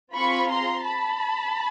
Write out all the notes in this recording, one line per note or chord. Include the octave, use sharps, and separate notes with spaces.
C4 F4 G#4 B5 C#6
A#5 C6
A5 B5